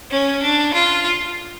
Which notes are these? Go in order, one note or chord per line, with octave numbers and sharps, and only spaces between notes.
C#4
D4
F4